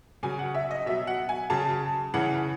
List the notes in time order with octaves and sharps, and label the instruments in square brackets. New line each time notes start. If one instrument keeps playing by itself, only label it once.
[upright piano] C#3 F#3 G#5
F#5
E5
D#5
B2 F#3 E5
F#5
G#5
C#3 F#3 A5
C#3 E3 F#5